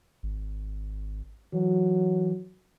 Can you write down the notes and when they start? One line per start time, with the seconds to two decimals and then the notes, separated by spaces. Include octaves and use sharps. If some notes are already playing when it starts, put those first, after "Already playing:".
0.23 G#1
1.53 E3 F#3